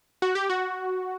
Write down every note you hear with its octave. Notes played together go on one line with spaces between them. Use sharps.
F#4
G4
F#4